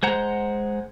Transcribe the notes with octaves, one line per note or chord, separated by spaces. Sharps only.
G#3 C5 F#5 A#5